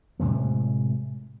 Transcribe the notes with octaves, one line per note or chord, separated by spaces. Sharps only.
A2 C3 G#3 A3